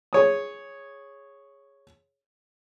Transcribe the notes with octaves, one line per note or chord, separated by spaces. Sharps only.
G#4 C#5 D#6